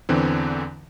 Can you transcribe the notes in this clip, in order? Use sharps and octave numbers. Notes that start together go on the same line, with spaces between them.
E2 D3 E3 C4